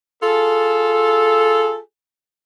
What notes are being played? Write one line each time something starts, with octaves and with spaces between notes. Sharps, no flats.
F4 G#4 A4